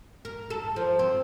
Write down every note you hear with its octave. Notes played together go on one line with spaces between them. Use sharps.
A#4
A4
F3
C4